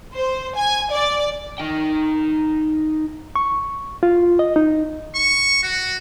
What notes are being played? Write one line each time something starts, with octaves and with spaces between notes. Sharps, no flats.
C5
G#5
D5
D#4 G5
C#6
F4
D#5
D#4
C#6
F#4